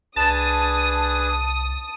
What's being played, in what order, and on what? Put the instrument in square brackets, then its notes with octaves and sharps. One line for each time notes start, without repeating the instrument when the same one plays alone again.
[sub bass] C2 [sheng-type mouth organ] D4 G#4 B4 [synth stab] A5 [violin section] D#6